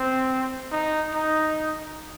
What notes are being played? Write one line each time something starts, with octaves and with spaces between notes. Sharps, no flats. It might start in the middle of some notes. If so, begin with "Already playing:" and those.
Already playing: C4
D#4
D#4